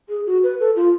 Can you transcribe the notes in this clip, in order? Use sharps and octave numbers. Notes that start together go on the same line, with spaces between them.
G#4
F#4
B4
A4
F4